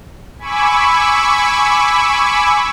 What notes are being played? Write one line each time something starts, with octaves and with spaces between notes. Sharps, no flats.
G#5 B5 C#6 D6 E6